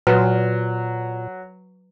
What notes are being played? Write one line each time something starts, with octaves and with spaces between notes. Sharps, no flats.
A#2 F#3 B4